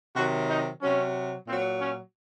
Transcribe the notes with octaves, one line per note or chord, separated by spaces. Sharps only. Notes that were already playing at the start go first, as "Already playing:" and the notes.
C3 D#3 F#3 F#4
D#4
C3 F#3 C#4
A#2 F#3 C4
C#4